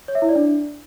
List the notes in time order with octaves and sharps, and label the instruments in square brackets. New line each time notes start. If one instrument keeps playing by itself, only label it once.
[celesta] C#5
E5
E4
D5
D4